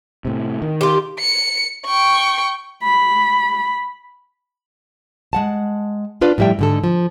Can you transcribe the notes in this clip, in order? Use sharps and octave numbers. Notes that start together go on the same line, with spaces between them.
A2 C3
D#3
F4 G4
C#7
G5 C#6
B5
G#3 F#5 A5
D4 F4 B4 D5
A2 F3 G3 E5 G5
G#2 D3 A4
F3